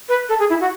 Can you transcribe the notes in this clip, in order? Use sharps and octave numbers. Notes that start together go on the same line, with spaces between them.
B4
A4
G#4
E4
F#4